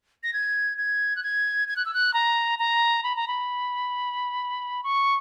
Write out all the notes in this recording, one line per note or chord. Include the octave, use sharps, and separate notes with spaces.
A#6
G#6
G#6
F#6
G#6
G#6
F#6
E6
F#6
A#5
A#5
B5
A#5
B5
C#6